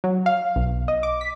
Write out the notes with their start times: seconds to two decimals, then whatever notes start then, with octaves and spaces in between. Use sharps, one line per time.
0.04 F#3
0.26 F5
0.56 B1
0.88 D#5
1.03 D6
1.21 B6